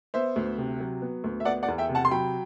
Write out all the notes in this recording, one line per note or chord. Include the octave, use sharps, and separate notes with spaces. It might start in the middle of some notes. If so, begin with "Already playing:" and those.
B3 C5 E5
D2
C3
F#3
B3
D2
E5
B3 D5 F#5
D5 F#5
E2
E5 G5
C3
F#5 A5
C6
F#3 G5 B5